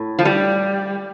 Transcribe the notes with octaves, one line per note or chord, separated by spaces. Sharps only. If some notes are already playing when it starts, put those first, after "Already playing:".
Already playing: A2
F3
G3